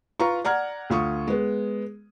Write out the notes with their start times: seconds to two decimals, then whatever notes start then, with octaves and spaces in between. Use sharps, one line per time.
0.20 F4 B4 A#5 C#6
0.44 D5 F#5 A#5 F6 G#6
0.90 D2 F4 C#6 D#6
1.27 G#3 B3